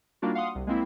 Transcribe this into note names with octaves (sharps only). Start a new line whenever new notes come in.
G3 A#3 D4 D#4 F4 F#4
F5 F#5 C6 D#6
C2
G#3 A#3 C4 E4